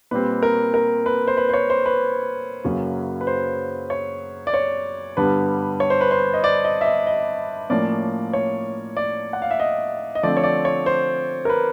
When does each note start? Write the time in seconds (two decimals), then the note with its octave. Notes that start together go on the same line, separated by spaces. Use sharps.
0.11 A#2 G3 C4 B4
0.43 A#4
0.74 A#4
1.06 B4
1.28 C5
1.37 B4
1.49 C5
1.53 C#5
1.70 C5
1.86 B4
2.64 F#2 C#3 F#3 A#3
3.21 B4
3.27 C5
3.90 C#5
4.47 D5
4.54 C#5
5.17 G2 D3 G3 B3 B4
5.80 C#5
5.90 C5
6.01 B4
6.11 C5
6.34 D#5
6.44 D5
6.64 D#5
6.81 E5
6.86 D#5
7.07 D#5
7.70 A2 F3 A#3 C#4 D5
8.33 C#5
8.97 D5
9.33 F#5
9.42 F5
9.51 E5
9.60 D#5
10.15 D#5
10.23 D3 F3 A3 C4 D5
10.37 C#5
10.44 D5
10.65 C#5
10.86 C5
11.45 A#4
11.49 B4